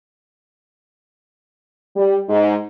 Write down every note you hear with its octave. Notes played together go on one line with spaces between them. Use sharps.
G3
G#2